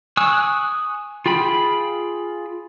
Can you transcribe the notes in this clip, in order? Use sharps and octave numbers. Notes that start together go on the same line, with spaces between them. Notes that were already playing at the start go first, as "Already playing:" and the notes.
G#5 C#6 D#6 E6 F#6
F4 G#4 G5 B5